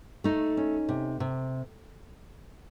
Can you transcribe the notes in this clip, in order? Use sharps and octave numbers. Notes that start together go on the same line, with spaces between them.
A3 D#4
C#4
C3
C3